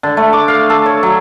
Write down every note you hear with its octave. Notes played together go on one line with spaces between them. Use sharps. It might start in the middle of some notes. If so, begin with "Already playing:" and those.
D3
A3
D6
F5
A4
C#5
F#3